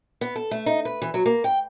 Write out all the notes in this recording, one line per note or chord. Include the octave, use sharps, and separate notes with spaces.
B3
A4
A3
D#4
B4
E3
F#3
A#3
G5